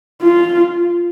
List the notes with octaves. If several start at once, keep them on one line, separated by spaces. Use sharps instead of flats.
F4